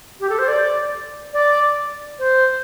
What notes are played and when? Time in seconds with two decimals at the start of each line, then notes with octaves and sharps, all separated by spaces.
0.20 G4
0.30 A4
0.39 C5
0.48 D5
1.33 D5
2.19 C5